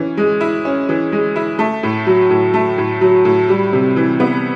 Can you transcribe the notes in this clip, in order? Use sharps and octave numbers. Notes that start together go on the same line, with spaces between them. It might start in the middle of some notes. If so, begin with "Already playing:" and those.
Already playing: E3 C#4
G#3
E4
C#4
E3
G#3
E4
A3
A2
F#3
A2
A3
A2
F#3
A2
G3
C3
E3
B3